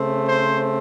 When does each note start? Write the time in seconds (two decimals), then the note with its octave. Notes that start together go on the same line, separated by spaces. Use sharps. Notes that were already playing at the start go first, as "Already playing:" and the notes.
Already playing: C#3 A3 C4
0.26 C5